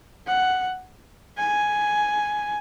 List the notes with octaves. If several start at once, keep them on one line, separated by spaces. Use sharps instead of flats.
F#5
G#5